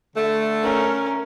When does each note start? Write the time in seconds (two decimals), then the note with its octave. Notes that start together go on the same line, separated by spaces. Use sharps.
0.16 D3 A3
0.63 C#4 A#4